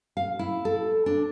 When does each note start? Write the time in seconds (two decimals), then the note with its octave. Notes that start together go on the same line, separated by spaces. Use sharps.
0.17 F5
0.39 E4
0.65 A4
1.06 D4